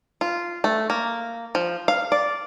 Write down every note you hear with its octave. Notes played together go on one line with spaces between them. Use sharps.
F4
A3
A#3
F3
F5
D5